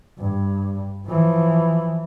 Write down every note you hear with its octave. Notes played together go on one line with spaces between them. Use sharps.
G2
E3 F3